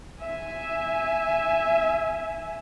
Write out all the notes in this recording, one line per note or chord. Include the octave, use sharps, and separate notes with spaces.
E5 G#5